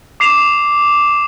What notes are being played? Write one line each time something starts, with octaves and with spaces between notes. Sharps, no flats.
D6 C7 E7 F7